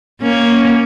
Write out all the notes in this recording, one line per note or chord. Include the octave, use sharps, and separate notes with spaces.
A#3 C#4